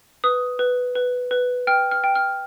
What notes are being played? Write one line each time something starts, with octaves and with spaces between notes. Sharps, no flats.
B4 D#6
B4
B4
B4
G5 F6
F6
G5
F6